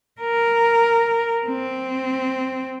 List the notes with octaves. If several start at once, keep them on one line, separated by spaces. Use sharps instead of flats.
A#4
C4